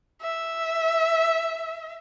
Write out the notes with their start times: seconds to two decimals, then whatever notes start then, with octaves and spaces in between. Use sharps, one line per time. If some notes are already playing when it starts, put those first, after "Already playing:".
0.22 E5